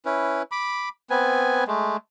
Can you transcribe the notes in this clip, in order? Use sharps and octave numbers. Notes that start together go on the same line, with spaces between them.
C#4 E4 B4
B5 D6
B3 C4 B4 G#5
G#3 A3